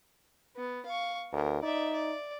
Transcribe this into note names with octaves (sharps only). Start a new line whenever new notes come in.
B3
F5 C#6
D2 A#4
D#4 D5 E5
D5